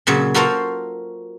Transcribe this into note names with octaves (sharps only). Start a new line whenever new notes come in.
A#2 C#3 F#3
F4 F#4 A4 A#4 C5 F5